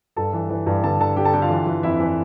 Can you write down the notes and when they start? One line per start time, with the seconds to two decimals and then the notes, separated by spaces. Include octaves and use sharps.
0.16 G2 A4 A5
0.33 E3
0.50 E3
0.67 G2
0.83 D3 A4 A5
1.00 D3 A4 A5
1.16 D3 G4 G5
1.25 A4 A5
1.33 D3 G4 G5
1.42 F4 F5
1.50 E3
1.66 E3
1.83 F2 E4 E5
2.00 E3